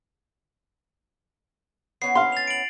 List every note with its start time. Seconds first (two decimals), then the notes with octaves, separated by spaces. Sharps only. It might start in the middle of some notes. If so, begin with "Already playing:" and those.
2.02 B3 C#4 E4 C7
2.15 F5 C6
2.32 A6 F7
2.47 D7 F#7